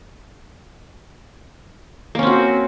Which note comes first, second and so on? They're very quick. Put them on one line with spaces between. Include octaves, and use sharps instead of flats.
A#3 C#4 C4 F#4